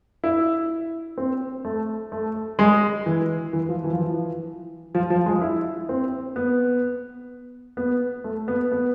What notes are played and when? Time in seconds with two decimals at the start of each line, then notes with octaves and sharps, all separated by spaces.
0.24 E4
1.17 C4
1.65 A3
2.12 A3
2.59 G#3
3.06 E3
3.53 E3
3.69 F3
3.84 E3
3.93 F3
4.00 E3
4.95 F3
5.10 F3
5.26 G#3
5.42 E4
5.89 C4
6.36 B3
7.77 B3
8.24 A3
8.48 B3
8.72 B3